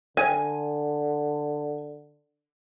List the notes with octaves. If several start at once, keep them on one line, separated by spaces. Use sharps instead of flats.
D3 G#5